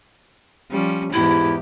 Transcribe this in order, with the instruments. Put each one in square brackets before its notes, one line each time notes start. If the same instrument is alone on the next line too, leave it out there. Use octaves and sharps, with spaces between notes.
[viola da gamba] F3 G3 C#4
[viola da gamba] E2 G#2 G4 [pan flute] E4